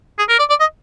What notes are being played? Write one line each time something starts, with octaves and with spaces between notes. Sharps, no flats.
G#4
A#4
D5
D5
D#5